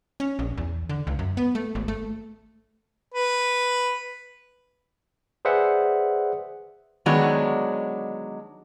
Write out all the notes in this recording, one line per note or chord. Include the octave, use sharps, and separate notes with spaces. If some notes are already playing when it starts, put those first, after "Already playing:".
C#4
A#1
E2
D3
C#2
F#2
B3
A3
G#1
A3
B4
G#4 B4 C5 D5 E5 F#5
D3 D#3 F#3 G#3 B3 D4